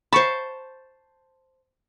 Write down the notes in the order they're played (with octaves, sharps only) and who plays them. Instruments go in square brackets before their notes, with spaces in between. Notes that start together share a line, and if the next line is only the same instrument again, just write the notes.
[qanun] C5 A5 [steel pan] B5 C#6